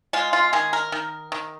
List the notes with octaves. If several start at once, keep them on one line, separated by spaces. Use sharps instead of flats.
G#3 F4
F4
D#3 G#4
A#4
D#3
D#3